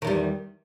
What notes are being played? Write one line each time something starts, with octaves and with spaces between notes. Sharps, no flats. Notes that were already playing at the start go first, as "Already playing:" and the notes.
E2 D#3 G3